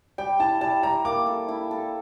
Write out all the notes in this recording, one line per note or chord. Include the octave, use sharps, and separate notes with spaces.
G3 G5
E4 A5
G3 A5
G3 A#5
A#3 D6
A4
E4
A4